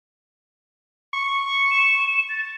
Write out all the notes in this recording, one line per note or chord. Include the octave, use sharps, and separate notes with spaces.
C#6
E7
A6